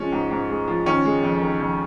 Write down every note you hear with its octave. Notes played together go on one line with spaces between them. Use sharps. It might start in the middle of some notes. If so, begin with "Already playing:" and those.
Already playing: F3 G#3 C#4
G#2
G#2
G#3
F3
D#3 C#4
G#3
F2
D#3
F2